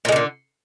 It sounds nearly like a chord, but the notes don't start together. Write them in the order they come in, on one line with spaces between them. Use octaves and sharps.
A#2 G#3 D#3 D3